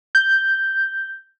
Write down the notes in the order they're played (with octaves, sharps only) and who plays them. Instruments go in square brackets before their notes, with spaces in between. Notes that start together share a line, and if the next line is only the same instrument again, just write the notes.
[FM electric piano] G6